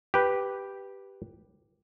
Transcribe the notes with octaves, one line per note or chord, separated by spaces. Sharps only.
G4 B4